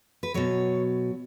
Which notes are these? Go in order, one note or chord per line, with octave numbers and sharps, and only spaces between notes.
B4
B2 F#3 C#5